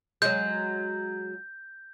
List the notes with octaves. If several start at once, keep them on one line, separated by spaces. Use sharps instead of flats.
F#3 G#3 G6